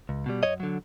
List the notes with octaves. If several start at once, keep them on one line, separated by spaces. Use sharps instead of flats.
C#2
B2 G3
F#2 C#5 D#5
D3 F#3